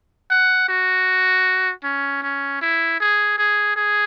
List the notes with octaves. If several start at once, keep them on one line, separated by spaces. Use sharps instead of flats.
F#5
F#4
C#4
C#4
E4
G#4
G#4
G#4